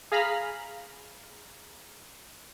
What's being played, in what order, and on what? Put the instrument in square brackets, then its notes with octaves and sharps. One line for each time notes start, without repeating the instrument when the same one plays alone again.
[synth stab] G#4 F5 A#5 B5 F6